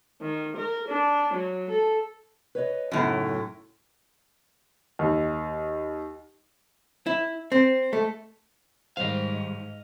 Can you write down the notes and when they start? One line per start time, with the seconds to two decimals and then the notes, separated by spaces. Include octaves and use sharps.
0.21 D#3
0.57 A#4
0.88 D4
1.33 F#3
1.70 A4
2.55 B4 C#5 D#5
2.92 F#2 A2 C#3 B3 D#4
4.99 D#2
7.06 E4
7.52 C4
7.93 A3
8.97 G#2 D#3 G3 C5 D#5 F5